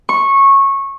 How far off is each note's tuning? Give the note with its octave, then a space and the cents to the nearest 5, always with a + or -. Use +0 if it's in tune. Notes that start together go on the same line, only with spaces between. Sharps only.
C#6 -15